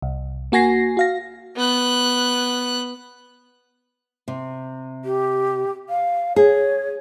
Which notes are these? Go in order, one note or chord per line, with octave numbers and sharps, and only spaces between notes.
C2
A#3 F#4 G#5 A#6 C7
F#4 F5 A#6
B3 F#6
C3
G4
F5
G#4 C#5